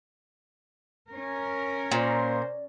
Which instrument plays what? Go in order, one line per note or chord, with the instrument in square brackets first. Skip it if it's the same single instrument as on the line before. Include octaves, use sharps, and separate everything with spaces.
[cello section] C#4 A#4
[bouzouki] A#2 [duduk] C5 [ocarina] D5